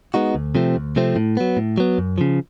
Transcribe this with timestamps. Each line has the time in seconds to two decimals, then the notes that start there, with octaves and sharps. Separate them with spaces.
0.14 G#3 B3 D#4 F#4
0.35 D2
0.55 C3 F3 A3 C4
0.76 D2
0.96 C3 F3 A3 C4
1.16 A2
1.37 F#3 B3
1.57 A2
1.78 F#3 B3
1.98 F#2
2.18 C#3 F3